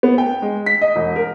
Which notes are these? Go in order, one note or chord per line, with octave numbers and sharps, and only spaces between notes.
B3
G5
G#3
B6
D#5
E1
A#4